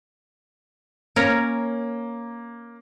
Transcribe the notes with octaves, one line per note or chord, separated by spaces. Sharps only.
A#3 C#4 A#4 C#5